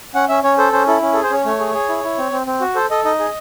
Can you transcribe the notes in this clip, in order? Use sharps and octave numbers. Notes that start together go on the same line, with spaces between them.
C#4 F#5
C#4 E5
C#4 C#5
A4 C5
C#4 C5
E4 A4
C#4
A4
G#4
C5
C#4 C#5
A3 C#5
G#4
G#4
E4
E4
C4
C4
C4
F#4
A4 C5
A4 D#5
D#4 D#5
G#4